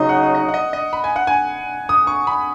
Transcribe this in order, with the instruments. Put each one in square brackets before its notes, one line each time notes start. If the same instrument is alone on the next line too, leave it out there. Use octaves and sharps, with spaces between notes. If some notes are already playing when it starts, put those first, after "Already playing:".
Already playing: [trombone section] C#3 F#3 D#4 [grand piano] D#5
[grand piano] F#5
D#5
F#5
D#5
D#5
B5
G#5
F#5
G#5
D#6
C#6
B5